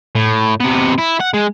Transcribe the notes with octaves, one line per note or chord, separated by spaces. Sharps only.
A2
C3 B3
E4
F#5
G#3